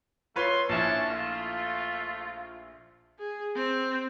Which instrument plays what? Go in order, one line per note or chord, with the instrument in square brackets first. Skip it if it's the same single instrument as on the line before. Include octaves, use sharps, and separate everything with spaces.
[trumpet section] A3 C6 [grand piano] F4 B4 C#5
[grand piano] A#1 E4 [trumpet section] C#4 D4 A5
[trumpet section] A3 F4
[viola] G#4
C4